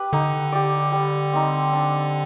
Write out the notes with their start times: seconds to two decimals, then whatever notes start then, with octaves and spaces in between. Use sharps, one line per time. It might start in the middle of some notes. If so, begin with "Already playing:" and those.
Already playing: G4 B4
0.13 D3 D#4
0.52 G4 D5
0.92 G3
1.33 C4 D#4
1.73 D4